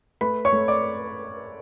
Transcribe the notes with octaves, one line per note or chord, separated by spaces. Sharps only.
A3 B4 B5
C#5 C#6
A3
D5 D6